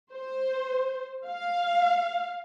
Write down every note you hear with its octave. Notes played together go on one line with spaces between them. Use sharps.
C5
F5